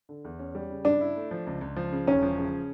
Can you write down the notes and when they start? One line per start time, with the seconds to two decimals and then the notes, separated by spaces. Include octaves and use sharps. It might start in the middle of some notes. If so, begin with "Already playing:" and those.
0.09 D3
0.25 E2
0.39 C#4
0.55 G3
0.70 C#3
0.85 G2 D4
1.01 E4
1.16 A3
1.31 F3
1.47 C#2
1.61 C#2
1.76 F3
1.92 C#3
2.07 E1 C#4
2.23 F3
2.38 C#3